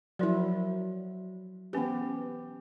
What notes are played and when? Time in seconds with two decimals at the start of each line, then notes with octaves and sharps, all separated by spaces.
0.19 F3 F#3 E4 A#4 D5
1.73 E3 B3 C#4 G4 B4